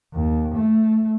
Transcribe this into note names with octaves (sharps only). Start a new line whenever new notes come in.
D#2
A3